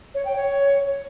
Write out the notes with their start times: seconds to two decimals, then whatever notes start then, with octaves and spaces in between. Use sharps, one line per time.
0.15 C#5
0.25 G5
0.36 C#5